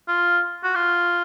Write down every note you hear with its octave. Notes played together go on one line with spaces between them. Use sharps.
F4
F#4
F4